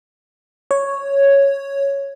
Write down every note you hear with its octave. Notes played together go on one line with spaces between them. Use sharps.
C#5